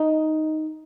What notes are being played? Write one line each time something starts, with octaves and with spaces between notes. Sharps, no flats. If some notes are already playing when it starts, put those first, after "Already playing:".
Already playing: D#4